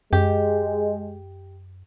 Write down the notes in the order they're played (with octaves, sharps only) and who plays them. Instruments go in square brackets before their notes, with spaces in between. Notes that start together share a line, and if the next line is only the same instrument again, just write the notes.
[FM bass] F#2 [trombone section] G#3 [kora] G4